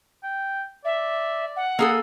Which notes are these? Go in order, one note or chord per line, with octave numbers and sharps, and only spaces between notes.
G5
D5 E5
F#5
A#3 G#4 A4 E6